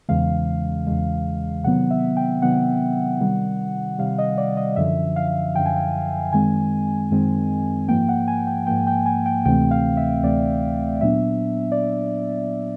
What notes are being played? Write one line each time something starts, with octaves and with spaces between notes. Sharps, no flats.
E2 C#3 E3 G#3 F5
E2 C#3 E3 G#3
C3 D#3 F#3 B3 F#5
E5
G5
C3 D#3 F#3 B3 F#5
C3 D#3 G3
C3 D#3 G3 F5
D#5
D5
D#5
F#2 D3 F3 E5
F5
F#2 D3 F3 G5
G#5
G5
F#2 D#3 G#3 C4 G#5
F#2 D#3 G#3 C4
G#2 F3 A#3 G5
F#5
G#5
G5
G#2 F3 A#3 G5
G5
G#5
G5
D2 C3 E3 A3 C4 G5
F5
E5
D2 C3 E3 A3 C4 D5
A#2 F#3 B3 D4 E5
D5